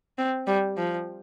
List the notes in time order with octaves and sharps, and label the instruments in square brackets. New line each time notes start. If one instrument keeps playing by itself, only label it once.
[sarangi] C4
G3
F3